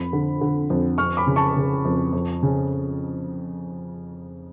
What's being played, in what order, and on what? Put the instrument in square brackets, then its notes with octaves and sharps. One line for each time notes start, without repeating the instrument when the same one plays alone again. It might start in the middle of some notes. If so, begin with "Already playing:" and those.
Already playing: [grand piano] F2 B5
D3
D3
F2
F2 C#6 F6
B5 D6
C#3
A5 C#6
C#3
F2
F2
C#3